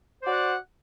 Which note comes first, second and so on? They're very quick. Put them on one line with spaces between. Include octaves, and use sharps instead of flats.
C5 D5 F#4 F#5